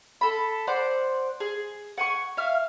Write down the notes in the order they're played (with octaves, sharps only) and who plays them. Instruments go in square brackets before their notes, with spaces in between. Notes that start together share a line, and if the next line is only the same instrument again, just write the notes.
[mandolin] A4 B5
C5 D5 F#5 C6
G#4
F#5 G#5 C#6
E5 F5 F6